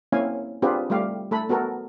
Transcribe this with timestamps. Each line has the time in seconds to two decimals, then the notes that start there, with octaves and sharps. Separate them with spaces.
0.12 A#3 C4 C#4 E4 F5 G#5
0.62 C4 D4 F4 G4 G#4 B4
0.90 G3 A3 G4 F5
1.31 A3 A4 B5
1.49 B3 F#4 A4 A#4